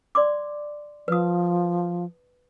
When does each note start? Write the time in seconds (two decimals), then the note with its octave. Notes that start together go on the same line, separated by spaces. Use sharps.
0.15 D5 C6 D6
1.08 F3 B4 D#6